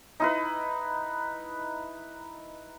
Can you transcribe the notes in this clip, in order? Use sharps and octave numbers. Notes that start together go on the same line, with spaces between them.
D#4 E4 B4